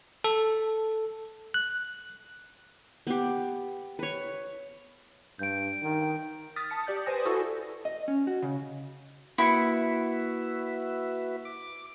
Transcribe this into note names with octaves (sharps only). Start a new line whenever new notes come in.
A4
F#6
B3 G4
B4 C#5
G2 G6 D7
D#3
D#6 F6 A6 B6
A5 C#7
G4 D5 G6
B4 C5 G#5 D#6 A#6
E4 F#4 A4 C#6 E6
D#5
C#4
F#4
C#3
A#3 E4 F#4 B4 E5 B6 C#7
D6